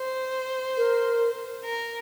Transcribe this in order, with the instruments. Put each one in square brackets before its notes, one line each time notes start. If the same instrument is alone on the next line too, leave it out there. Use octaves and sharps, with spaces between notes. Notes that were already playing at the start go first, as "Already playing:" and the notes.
Already playing: [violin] C5
[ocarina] A#4
[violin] A#4